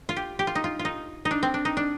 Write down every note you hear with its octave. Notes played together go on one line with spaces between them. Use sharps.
F4
G4
G4
F4
D#4
F4
F4
D#4
D#4
D4
C4
D4
D#4
D4